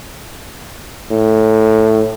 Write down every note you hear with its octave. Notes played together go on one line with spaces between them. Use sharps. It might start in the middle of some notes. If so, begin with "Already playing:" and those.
A2